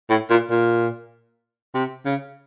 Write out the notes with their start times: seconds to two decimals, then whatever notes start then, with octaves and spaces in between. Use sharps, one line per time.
0.10 A2
0.30 A#2
0.50 A#2
1.74 C3
2.05 C#3